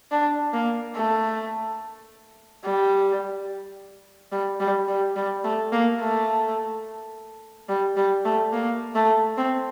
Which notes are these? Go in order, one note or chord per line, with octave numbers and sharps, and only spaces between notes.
D4
A#3
A3
G3
G3
G3
G3
G3
A3
A#3
A3
G3
G3
A3
A#3
A3
C4